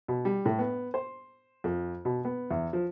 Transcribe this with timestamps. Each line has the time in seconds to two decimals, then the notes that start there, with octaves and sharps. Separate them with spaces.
0.08 B2
0.25 G3
0.46 A2
0.59 B3
0.94 C5
1.64 F2
2.05 B2
2.25 B3
2.51 E2
2.73 F3